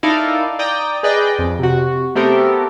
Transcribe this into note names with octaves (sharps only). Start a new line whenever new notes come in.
D#4 E4 A4 A#4 D5 F5
D5 G5 A#5 D#6
G#4 B4 D5 D#5 G5
F2
C3 F#4
A3 B3 C4 G4 A4 A#4